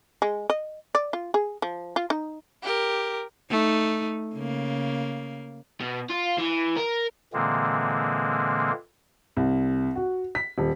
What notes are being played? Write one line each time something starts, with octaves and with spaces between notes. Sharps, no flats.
G#3
D#5
D5
F4
G#4
F3
F4
D#4
G4 A#4
A3 D#4
C#3 A#3
B2
F4
E3
A#4
A#2 D3 E3 G#3 A#3 C4
C2
F#4
B6
D#1